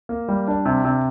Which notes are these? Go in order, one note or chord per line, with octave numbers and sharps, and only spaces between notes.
A#3
G3
D4
C3
C3